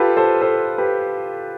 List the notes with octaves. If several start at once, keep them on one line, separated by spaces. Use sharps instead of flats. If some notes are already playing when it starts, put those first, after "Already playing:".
Already playing: F4 G4 A4 B4
A4 C5
A4 C5
G4 B4